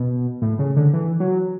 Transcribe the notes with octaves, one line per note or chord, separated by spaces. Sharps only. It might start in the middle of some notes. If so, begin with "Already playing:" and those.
Already playing: B2
A2
C#3
D3
E3
F#3